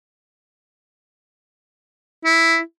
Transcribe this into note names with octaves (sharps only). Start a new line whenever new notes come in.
E4